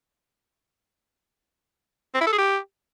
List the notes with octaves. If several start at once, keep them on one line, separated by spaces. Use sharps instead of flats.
C4
E4
A4
G#4
G4